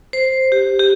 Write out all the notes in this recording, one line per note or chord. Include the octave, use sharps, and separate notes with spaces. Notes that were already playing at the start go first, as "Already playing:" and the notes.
C5
G4
G4